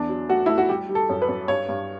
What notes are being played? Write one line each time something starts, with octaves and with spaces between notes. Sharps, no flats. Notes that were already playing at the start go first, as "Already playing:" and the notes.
Already playing: E2 D4
F#3
A3 F#4
A3 E4
F#4
G3 G4
G3
A4
F#2
B4
F#2
G2 C#5
G2